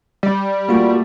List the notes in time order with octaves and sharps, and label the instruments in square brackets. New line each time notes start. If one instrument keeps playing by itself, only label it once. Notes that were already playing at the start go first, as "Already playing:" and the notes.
[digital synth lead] G3
[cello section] A3 [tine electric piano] A#3 F4 F#4